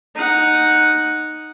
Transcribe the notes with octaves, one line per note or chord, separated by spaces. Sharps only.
D#4 F#5